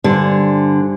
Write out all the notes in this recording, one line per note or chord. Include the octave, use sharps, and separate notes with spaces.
G2 D3 C5 G#5